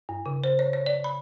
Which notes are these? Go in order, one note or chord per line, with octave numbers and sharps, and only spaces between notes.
G2
C#3
C5
C#5
C#5
D5
B5